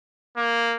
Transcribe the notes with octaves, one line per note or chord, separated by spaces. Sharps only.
A#3